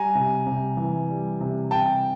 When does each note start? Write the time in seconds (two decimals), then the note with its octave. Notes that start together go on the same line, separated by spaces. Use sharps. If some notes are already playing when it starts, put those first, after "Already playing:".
Already playing: G3 G#5 A#5
0.15 C3
0.46 C3
0.77 E3
1.10 G3
1.41 C3
1.71 C3 G5 A5